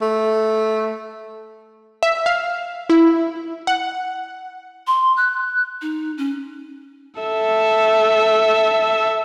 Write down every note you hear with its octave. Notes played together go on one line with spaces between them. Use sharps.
A3
E5
F5
E4
F#5
C6
F#6
D#4
C#4
A4 E5